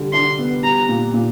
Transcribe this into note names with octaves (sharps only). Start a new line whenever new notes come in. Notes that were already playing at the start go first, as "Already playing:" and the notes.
Already playing: D3 G3
D4 C6
B3
G3 A#5
A#2
A#2